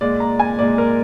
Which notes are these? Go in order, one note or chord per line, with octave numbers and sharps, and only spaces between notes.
A#2 G#3 D5
A#5
G#5
A#2 G#3 D5
A#4